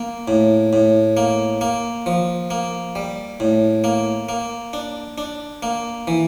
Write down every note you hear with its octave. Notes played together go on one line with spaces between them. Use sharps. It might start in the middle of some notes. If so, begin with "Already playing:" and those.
Already playing: A#3
A2
A2
A#3
A#3
F3
A#3
G3
A2
A#3
A#3
D4
D4
A#3
E3